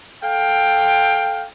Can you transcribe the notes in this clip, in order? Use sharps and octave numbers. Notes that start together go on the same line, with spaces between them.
A4 F5 G5